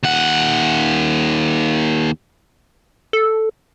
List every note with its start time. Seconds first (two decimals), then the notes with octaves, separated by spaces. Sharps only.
0.03 D#2 F#5
3.13 A4